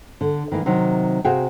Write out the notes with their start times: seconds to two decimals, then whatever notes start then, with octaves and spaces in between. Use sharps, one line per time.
0.21 D3
0.52 D#3 E3 A#3
0.66 C3 D#3 F#3
1.25 C3 F#4 G#4 F5 G5